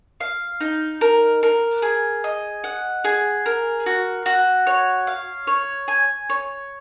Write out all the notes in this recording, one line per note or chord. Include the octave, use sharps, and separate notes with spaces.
F5
D#4
A#4
A#4
G#4
D#5
F#5
G#4
A#4
F#4
F#4
C#5
F5
C#5
G#5
C#5